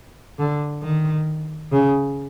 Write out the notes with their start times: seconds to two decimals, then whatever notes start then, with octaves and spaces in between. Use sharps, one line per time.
0.39 D3
0.83 D#3
1.72 C#3